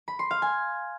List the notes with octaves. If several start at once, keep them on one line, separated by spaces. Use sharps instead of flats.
B5
C6
F5
G#5